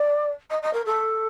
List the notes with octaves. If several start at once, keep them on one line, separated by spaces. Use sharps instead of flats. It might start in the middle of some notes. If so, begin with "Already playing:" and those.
Already playing: D5
D#5
D#5
A#4
A4